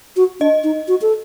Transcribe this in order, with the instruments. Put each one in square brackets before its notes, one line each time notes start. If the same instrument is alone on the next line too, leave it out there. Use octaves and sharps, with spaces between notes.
[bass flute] F#4
[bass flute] D4 [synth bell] D#5
[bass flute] D#4
F#4
A4